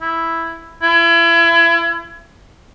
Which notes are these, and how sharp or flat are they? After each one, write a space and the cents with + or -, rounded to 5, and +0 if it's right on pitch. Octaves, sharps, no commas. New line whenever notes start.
E4 +0
E4 +35